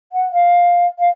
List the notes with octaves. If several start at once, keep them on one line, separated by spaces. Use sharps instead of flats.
F#5
F5
F5